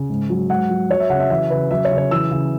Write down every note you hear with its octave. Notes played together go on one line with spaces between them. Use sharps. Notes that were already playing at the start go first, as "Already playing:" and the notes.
Already playing: C#3
G#2
F#3
G#2 F#5
F#3
F#3 C#5
E5
C#3 F#5
E5
E3 E5
C#3 B4
F#3 E5
C#5
C#3
C#5
E3 E6
C#3